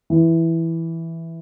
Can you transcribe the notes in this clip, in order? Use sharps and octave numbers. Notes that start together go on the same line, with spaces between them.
E3